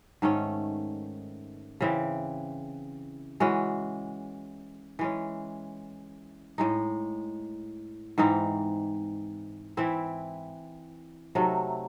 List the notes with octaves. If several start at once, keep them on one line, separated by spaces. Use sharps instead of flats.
G#2 D#3 A3 C#4
C#3 E3 C4
E3 G#3 C#4 F#4
E3 G#3 C#4
A2 G#3 D#4
G#2 E3 C4 D#4
E3 C4 E4
C3 F#3 A3 D#4